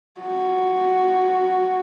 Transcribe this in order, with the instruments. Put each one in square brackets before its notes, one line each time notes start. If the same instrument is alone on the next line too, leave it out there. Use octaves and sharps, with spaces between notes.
[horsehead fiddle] F#4